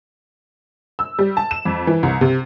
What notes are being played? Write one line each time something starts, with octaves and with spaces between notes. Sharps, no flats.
E6
G3
A5
E7
F2
E3
C2
C3